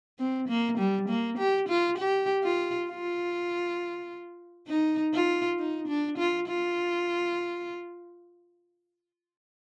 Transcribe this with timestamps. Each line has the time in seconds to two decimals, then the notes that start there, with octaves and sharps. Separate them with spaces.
0.19 C4
0.48 A#3
0.78 G3
1.08 A#3
1.38 G4
1.69 F4
1.98 G4
2.43 F4
2.89 F4
4.68 D#4
5.14 F4
5.59 D#4
5.88 D4
6.18 F4
6.48 F4